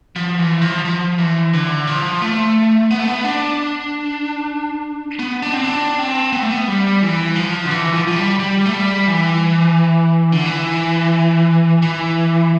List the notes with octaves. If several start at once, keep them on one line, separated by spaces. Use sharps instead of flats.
F3
E3
F3
F3
E3
D3
F3
A3
B3
A3
B3
D4
B3
D4
C4
D4
C4
B3
A3
B3
G3
E3
F3
D3
E3
F3
F3
G3
G3
A3
G3
E3
D3
E3
E3